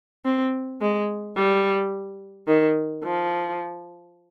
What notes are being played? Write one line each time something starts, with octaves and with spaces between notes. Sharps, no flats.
C4
G#3
G3
D#3
F3